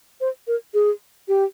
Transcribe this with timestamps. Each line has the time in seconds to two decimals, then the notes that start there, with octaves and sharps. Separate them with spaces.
0.21 C5
0.47 A#4
0.74 G#4
1.28 G4